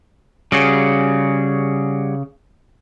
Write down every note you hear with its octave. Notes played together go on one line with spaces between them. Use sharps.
C#3 G3 F#4 G#4